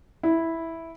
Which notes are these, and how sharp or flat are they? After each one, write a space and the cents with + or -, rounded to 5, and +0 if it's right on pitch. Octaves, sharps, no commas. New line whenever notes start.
E4 -5